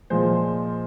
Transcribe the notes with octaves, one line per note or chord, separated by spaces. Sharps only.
A#2 F3 G#3 C5